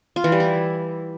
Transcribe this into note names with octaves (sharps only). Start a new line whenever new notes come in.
F4
E3
G3
E4